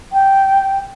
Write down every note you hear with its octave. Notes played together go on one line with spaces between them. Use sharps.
G5